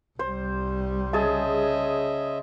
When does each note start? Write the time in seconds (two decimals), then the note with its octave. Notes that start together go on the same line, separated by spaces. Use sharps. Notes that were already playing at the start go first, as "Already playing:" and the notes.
0.19 C2 G3 C5
1.13 C#3 G#4 D#5 E5 A5